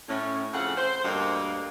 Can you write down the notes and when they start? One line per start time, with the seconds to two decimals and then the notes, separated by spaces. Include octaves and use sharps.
0.09 A2 C#4
0.54 F2 C#3 A4 F5 F#5
0.78 C5
1.05 D2 G2 A#3 D4 D#5 F5